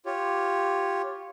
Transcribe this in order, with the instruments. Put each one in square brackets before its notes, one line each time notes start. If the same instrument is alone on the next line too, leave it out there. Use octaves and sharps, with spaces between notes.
[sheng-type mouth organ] F4 G4 C#5